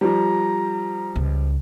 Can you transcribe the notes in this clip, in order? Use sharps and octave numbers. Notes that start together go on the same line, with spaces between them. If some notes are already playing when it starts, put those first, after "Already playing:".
F3 G3 A#5
C#2